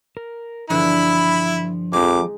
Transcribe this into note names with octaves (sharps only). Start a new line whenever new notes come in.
A#4
G2 D3 E3 F3 E4 B5
F2 G#3 D#4 D6